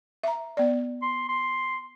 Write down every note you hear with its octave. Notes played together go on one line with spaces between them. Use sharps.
E5 A#5
B3 D5
C6
C6